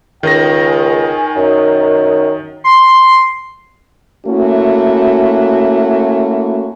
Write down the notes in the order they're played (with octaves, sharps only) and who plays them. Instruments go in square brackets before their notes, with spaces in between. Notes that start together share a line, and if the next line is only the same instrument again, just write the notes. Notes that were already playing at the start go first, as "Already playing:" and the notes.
[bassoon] C#2 [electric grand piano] D#3 D#5 A#6 [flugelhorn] G5
[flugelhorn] G#5
[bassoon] F#2 [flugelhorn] D#4
[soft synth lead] C6
[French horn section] A3 A#3 C#4 E4 F#4